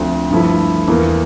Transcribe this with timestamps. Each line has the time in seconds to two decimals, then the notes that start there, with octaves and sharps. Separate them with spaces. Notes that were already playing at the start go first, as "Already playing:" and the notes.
Already playing: D2 D3 F3 C4
0.31 G2 F3 A3 E4
0.88 E2 E3 A#3